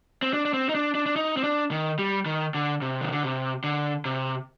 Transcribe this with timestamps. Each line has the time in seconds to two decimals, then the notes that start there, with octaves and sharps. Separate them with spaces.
0.22 C4
0.33 D4
0.45 D4
0.54 C4
0.69 D#4
0.75 D4
0.95 D4
1.06 D4
1.16 D#4
1.37 C4
1.44 D4
1.71 D#3
1.99 G3
2.26 D#3
2.54 D3
2.82 C3
3.01 D#3
3.12 D3
3.23 C3
3.64 D3
4.05 C3